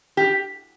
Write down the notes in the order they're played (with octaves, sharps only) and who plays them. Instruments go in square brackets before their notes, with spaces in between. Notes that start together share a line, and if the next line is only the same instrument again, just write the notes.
[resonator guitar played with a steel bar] G4